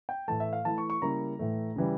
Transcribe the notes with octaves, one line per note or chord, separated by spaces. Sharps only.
G5
A2 E3 A3 A5
E5
F5
E3 A3 E4 A5
C#6
C#6
C#3 G3 A#3 E4 A#5
A2 E3 A3
C#3 E3 G3